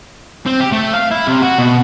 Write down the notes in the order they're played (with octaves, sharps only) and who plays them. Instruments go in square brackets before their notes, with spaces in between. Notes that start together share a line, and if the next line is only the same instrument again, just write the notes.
[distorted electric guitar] C4
G4
A3
F5
E4
C3
F#4
B2